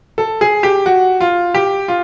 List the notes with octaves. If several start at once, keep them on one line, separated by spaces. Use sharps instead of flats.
A4
G#4
G4
F#4
F4
G4
F4